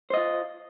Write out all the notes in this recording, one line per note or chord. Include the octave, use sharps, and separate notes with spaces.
F4 C5 D#5